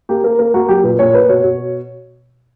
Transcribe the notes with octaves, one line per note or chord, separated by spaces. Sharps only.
A#3 G4
A#3 A#4
A#3 A#4
A#3 F#4
F#3 G4
A#2 B4
A#2 C#5
A#3 B4
B2 C#5
B2